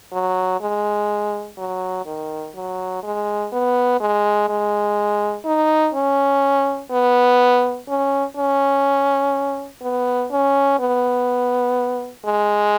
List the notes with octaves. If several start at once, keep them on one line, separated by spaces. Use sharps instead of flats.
F#3
G#3
F#3
D#3
F#3
G#3
B3
G#3
G#3
D#4
C#4
B3
C#4
C#4
B3
C#4
B3
G#3